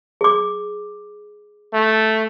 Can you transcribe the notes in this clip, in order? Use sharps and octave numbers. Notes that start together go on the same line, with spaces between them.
G#4 D6
A3